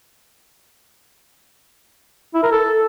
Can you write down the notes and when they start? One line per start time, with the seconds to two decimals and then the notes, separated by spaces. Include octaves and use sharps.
2.34 E4
2.43 A#4
2.52 A4